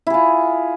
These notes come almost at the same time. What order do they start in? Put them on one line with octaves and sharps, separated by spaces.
E4 G#4 F4